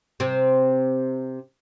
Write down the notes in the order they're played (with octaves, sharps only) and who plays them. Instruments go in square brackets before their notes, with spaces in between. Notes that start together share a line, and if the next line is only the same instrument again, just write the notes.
[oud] C3 C4